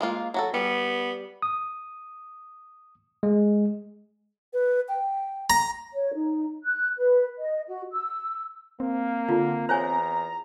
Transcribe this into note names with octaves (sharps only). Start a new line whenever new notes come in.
G#3 A#3 F4
F#3 F#4 A4
G3 B3
D#6
G#3
B4
G5
A#5
C#5
D#4
F#6
B4
D#5
F#4
E6
A#3 C4
D3 F4
E2 C5 C#5 G#5 A#5